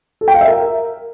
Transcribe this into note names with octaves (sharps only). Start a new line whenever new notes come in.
A4
G5
F5
E5
A#4